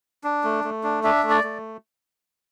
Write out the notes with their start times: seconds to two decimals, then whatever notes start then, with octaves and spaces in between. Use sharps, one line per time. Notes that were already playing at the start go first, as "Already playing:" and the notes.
0.24 D4
0.44 A3
0.64 A3
0.84 D4
1.04 D4 E5
1.23 A3
1.30 D5
1.44 A3